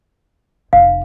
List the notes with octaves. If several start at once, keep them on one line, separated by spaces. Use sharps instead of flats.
F1 F5